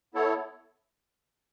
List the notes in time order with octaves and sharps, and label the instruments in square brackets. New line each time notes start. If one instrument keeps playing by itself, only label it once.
[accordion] B3 E4 A4 C#5